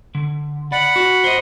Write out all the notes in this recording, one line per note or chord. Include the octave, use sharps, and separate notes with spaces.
D3
D5 F#5 B5
F#4
C5 D#5